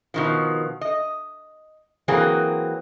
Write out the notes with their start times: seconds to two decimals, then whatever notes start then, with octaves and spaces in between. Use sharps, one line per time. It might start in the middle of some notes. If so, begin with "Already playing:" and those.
0.14 B2 D#3 F3
0.81 D#5
2.08 E3 F#3 A#3 C4 G#4